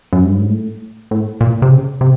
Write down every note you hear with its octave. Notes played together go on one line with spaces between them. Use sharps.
F#2
G2
G#2
A2
A2
A#2
C3
C#3
C3